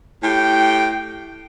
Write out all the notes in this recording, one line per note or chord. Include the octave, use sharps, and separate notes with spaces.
A2 G4 G5